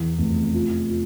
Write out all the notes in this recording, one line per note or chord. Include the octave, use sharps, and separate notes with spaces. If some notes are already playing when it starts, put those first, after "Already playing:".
Already playing: E2 E3
F1
F4
F4